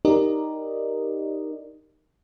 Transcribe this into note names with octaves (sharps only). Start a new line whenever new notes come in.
D#4 G4 A#4 D5 D#5